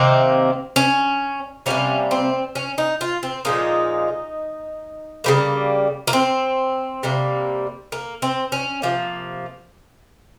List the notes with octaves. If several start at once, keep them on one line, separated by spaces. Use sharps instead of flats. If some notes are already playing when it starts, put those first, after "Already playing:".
Already playing: C3 D#3 A#3 C4
C#4
C3 G3 A#3 C#4
C4
C#4
D#4
F4
C4
A#2 F3 G#3 D#4
C#3 G3 A#3
A#3
C4
C3 G3 A#3
A#3
C4
C#4
C3 F3 A#3